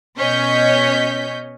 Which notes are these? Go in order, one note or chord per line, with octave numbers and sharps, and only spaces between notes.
B2 C#4 C#5 D#5 G6 B6